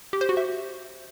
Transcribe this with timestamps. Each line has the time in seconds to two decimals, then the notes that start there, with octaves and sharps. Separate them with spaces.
0.13 G4
0.21 C5
0.29 F#4
0.37 E5